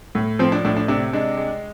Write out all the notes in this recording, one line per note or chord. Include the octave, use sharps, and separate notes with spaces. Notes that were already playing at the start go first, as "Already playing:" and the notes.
A2
F3 C4
D4
A2 D4
D4
C3 D4
G#3 D4
G#3